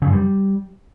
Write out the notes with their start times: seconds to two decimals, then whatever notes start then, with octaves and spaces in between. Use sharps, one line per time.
0.02 C#3
0.07 F#2
0.12 G3